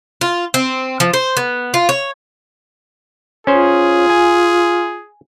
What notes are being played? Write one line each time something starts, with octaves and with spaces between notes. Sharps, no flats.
F4
C4
F3
C5
B3
F4
C#5
C#4 F4 G#4 C5
G#5